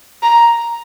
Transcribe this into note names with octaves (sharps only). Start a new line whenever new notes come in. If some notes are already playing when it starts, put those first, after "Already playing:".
A#5